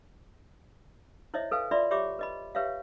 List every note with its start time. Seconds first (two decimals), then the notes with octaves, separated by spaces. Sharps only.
1.34 E4 C5 C#5 D#5 E5
1.51 A4 B4 F5 G#5
1.71 F4 B4 D5 E5 B5 C6
1.91 G4 C#5 E5 B5 D6
2.19 B4 D#5 B5
2.55 G4 B4 C#5 E5 F5